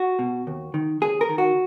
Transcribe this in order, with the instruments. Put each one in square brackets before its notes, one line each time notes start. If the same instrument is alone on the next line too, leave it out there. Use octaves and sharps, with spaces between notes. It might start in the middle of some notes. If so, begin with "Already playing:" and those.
Already playing: [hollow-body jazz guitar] F#4
B2
D#2
D#3
D#2 G#4
A#4
D#3
F#4